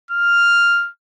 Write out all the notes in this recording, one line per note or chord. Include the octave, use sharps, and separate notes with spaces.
F6